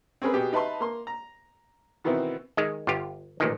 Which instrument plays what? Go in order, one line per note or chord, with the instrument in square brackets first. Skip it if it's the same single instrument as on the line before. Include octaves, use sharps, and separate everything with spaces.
[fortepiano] C4 C#4 G#4 A#4 B4
B2 B3 G4 G#4
D#4 B4 E5 A5 C6
A#3 C6
A#5
B2 D#3 E3 B3 C4 E4
[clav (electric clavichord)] D#3 G#3
G1 F4 G4
A1 A#2 D#3